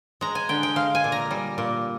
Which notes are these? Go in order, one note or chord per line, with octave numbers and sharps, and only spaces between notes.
G#3 A#5
G#5
D3 G5
G5
G#3 F5
G#5
A#2
A#5
G3
A#2